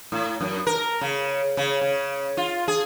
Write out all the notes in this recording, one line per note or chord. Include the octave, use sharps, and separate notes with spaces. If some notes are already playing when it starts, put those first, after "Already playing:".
A2
F#2
A#4
C#3
C#3
C#3
F4
G#4